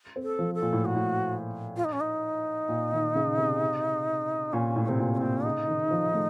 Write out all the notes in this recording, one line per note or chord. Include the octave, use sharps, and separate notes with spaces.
C4
A4
F3
A4
A#2
A2
F#4
A2
F4
D#4
C#4
D#4
A#2
D#3
C#3
C3
A#2 C#4
A2
C#4
C3 C4
A#2
C#4
A#2 C4
C#3 D#4
D#3
F3
A3